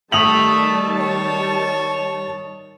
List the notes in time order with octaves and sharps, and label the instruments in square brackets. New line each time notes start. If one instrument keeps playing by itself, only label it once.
[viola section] D#3 G3 A5 [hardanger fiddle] A3 E5 [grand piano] D#6 F7 F#7
[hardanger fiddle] C#5